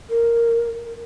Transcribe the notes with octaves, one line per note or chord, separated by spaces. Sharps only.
A#4